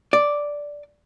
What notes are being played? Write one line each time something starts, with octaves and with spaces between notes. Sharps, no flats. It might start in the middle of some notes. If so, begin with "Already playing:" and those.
D5